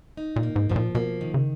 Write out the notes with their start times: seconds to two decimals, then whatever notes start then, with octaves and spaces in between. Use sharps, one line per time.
0.17 D#4
0.36 A#2
0.43 A#3
0.56 G#2
0.70 G#2 F3
0.76 A#2
0.95 B2 A#3
1.21 D#3
1.34 C#3